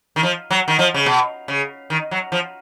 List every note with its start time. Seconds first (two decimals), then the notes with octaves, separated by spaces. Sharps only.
0.16 D#3
0.23 F3
0.51 F#3
0.68 D#3
0.79 F3
0.94 C#3
1.06 B2
1.48 C#3
1.90 D#3
2.11 F#3
2.32 F3